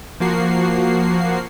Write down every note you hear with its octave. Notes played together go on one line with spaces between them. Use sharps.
F3 A#3 F#4 C7